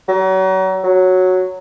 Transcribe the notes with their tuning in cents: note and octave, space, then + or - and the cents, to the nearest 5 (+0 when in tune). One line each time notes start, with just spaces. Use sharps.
F#3 +35
F#3 -5